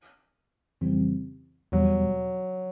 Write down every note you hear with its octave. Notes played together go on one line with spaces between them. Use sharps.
F2 C#3 E3 G3 C4
E2 B2 F#3 G3